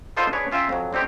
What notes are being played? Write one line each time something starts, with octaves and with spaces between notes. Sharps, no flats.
B3 D4 D#4 F4 A4 C5
D4 G#4 B4 C#5
C#4 F4 E5 G5 A#5
F2 F#3
D3 C4 D#4 G4 C#5